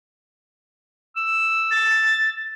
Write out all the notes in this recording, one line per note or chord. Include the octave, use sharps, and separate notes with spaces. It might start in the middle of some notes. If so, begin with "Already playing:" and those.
E6
A6